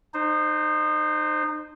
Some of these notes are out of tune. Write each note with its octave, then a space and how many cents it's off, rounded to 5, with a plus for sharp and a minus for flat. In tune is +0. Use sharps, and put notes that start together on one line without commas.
D#4 -30 C5 +0